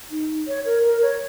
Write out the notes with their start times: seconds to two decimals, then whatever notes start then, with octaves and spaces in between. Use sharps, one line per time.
0.11 D#4
0.47 C#5
0.65 A#4
0.84 A#4
1.02 C#5